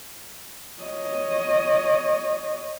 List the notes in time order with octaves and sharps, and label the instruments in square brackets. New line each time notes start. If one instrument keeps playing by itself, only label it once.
[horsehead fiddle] C#5 D#5